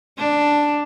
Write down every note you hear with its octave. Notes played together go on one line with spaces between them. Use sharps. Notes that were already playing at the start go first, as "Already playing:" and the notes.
D4